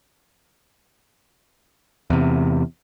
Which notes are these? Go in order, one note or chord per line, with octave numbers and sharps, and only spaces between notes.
E2 C3